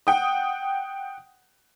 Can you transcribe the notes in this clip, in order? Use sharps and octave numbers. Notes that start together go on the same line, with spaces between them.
F#5 G5 D#6